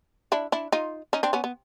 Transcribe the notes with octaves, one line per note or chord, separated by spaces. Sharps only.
D4 E4
D4 E4
D#4 F4
C#4 D#4
C4 D4
B3 C#4
B3